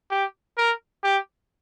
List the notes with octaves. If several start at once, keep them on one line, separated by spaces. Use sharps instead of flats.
G4
A#4
G4